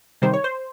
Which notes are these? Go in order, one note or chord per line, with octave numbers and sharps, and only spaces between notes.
C3 D#3 G3 C5
C#5
C5